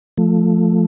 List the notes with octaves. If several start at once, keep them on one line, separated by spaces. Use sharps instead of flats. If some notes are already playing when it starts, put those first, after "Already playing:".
F3 A3